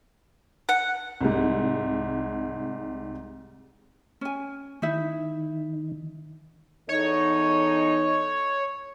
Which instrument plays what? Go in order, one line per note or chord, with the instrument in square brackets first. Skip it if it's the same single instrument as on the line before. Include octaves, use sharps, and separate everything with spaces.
[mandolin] F#5
[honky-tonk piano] C2 G#2
[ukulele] C#4 G#5
[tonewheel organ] D#3 [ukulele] D#4 E4 E5
[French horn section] E2 D#4 A4 [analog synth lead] C#5